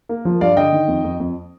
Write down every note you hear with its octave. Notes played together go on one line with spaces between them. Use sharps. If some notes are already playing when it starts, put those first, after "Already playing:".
A#3
F3
G2 D5 F5
D3 D#5 G5
D#3
F2
F2
F2